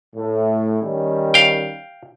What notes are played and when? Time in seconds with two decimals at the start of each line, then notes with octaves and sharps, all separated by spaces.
0.16 A2
0.83 D#3 G3 C#4
1.34 F5 G5